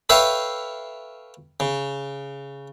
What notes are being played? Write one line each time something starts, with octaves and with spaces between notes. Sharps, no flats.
A4 B4 C#5 E5 F5 G5
C#3